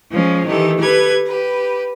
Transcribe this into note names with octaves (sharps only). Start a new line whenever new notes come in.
F3 G#3 C#4
D#3 E3 G4 A4
G4 A4 B4 G#6
G4 B4